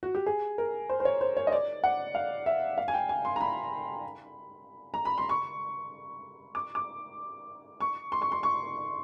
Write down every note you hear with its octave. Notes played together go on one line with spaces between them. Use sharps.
F#4
G4
G#4
A#4
C5
C5
C#5
C5
C#5
D#5
D5
F#5
F5
E5
F5
G#5
G5
G#5
C6
A#5
B5
A#5
B5
C6
C#6
D6
D6
C#6
C6
C#6
C6
C#6